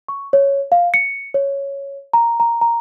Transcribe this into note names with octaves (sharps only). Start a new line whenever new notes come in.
C#6
C#5
F5
C#7
C#5
A#5
A#5
A#5